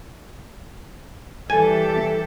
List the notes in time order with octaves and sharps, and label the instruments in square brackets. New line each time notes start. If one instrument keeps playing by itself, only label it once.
[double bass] E3 G3 [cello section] G4 A4 E5 [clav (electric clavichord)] G#5